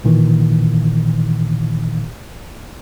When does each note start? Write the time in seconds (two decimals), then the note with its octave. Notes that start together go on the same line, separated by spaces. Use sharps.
0.04 A1 A#2 D#3 E3